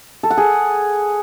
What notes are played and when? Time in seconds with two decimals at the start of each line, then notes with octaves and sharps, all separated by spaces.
0.23 A4
0.30 F#5
0.38 G#4